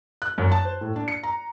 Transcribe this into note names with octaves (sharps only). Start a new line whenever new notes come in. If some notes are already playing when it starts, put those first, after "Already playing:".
F#6
F#2
A5
C5
A2
D4
C#7
A#5